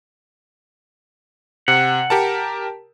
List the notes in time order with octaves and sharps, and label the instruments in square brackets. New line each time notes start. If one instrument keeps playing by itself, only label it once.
[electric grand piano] C3 [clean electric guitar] F#5
[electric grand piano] G4 A#4 A5